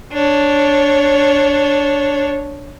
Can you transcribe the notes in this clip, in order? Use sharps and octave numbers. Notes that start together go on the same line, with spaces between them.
D4 C#5